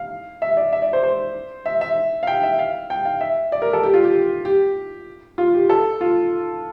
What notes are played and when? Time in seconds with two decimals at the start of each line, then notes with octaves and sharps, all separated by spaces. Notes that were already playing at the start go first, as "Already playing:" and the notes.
Already playing: F5
0.42 E5
0.57 D5
0.73 E5
0.82 D5
0.93 C5
1.03 C5
1.66 E5
1.81 E5
2.23 F5
2.27 G5
2.43 E5
2.59 F5
2.90 G5
3.05 F5
3.21 E5
3.52 D5
3.62 A#4
3.73 A4
3.83 G4
3.94 F4
4.04 G4
4.45 G4
5.38 F4
5.54 G4
5.70 A4
6.01 F4